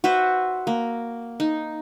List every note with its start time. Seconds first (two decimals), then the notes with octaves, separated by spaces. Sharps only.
0.04 F#4 B4 C5 E5
0.67 A#3
1.40 D#4